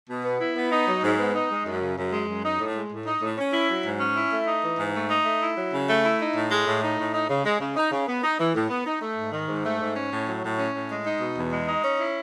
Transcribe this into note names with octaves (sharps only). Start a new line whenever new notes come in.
B2
B3
E4
B3
D#4
F#3
G#2
B3
D#4
G#3
F#2
C#3
F#2
G#3
F#2
D#4
A2
G#3
A2
D#4
A2
C#4
E4
F#3
G#2
C#4
E4
A3
D#4
E3
G#2
A3
D#4
A3
E4
F#3
C#3
A3
E4
D#4
A2
G#3
A2
D#4
A2
D#4
C#3
G#3
C#3
D#4
C#3
B3
D#4
E3
A2
B3
D#4
A3
G#2
D#3
G#2
A3
G#2
C#4
A2
F#3
A2
C#4
A2
G#3
D#4
B2
E2
G#3
D#4
C#4
E4